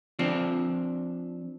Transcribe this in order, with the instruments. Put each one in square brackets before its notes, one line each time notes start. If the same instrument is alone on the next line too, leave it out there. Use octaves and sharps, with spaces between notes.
[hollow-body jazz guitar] F3 C4 D4